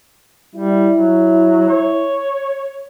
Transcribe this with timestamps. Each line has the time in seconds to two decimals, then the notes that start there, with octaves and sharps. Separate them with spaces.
0.56 G3 E4
0.94 F#3
1.69 C#5